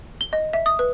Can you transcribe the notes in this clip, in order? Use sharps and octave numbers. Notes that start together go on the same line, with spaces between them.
G7
D#5
E5
D#6
B4